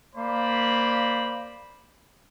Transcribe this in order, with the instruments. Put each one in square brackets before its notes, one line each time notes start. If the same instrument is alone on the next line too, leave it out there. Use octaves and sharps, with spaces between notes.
[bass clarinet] A#3 [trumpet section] C5 D5 B5